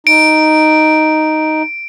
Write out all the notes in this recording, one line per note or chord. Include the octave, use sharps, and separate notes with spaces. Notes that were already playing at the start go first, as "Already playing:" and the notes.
D#4 D7